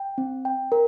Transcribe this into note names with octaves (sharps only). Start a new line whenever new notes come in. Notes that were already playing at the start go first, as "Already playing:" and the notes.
Already playing: G5
C4
G5
A#4